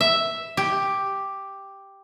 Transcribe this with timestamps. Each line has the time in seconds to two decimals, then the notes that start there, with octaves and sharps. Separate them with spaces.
0.01 E5
0.57 G4